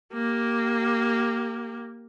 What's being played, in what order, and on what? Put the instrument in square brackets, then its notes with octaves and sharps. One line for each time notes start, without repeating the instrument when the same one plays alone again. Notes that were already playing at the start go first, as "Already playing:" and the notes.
[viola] A#3 G4